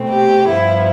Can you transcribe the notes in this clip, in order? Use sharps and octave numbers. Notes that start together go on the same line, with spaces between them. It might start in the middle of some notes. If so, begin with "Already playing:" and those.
Already playing: B2 A3 C4
G4
G2 F3 B3 E4